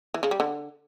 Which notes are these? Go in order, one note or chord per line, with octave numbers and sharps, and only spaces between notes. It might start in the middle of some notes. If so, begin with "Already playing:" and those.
E3
C#3
G3
D3